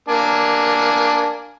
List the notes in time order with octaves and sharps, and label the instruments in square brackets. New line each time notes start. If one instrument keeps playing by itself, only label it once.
[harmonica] A#3 D4 G#5